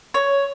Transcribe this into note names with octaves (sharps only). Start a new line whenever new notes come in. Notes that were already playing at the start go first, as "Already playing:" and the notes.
C#5